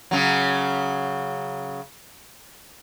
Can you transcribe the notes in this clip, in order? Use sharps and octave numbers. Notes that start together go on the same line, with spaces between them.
C#3 F#3